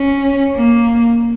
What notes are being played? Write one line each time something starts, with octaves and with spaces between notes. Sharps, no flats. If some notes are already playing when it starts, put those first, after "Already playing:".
Already playing: C#4
A#3